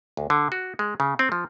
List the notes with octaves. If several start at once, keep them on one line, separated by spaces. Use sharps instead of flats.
D2
D3
F#4
G#3
C#3
C4
F3